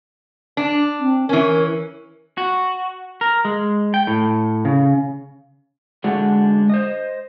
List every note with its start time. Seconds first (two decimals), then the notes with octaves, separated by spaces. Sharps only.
0.57 D4
1.00 C4
1.29 E3 C#4 A#4
2.38 F#4
3.21 A#4
3.45 G#3
3.94 G5
4.07 A2
4.65 C#3
6.04 D3 G#3 D4 F#4 F#5
6.70 C5 D#5